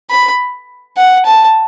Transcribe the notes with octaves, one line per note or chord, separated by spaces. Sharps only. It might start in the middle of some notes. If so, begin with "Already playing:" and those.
B5
F#5
A5